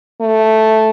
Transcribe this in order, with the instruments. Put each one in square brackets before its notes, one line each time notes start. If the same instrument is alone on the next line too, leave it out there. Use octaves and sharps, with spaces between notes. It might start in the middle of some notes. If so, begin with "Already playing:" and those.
[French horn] A3